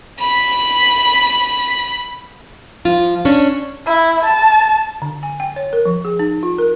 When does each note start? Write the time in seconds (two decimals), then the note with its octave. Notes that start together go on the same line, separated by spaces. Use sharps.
0.19 B5 B6
2.85 F3 F4
3.25 C#4 D4
3.86 E4
4.25 A5
5.02 D3
5.23 G#5
5.40 G5
5.56 C#5
5.73 A#4
5.86 F3
6.05 G#4
6.19 D#4
6.43 F4
6.58 A#4